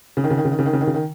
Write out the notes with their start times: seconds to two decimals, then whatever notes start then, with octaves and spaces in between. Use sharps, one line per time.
0.17 C#3
0.24 D#3
0.31 C#3
0.37 D#3
0.45 C#3
0.52 D#3
0.59 C#3
0.66 D#3
0.73 C#3
0.81 D#3
0.87 C#3
0.94 D#3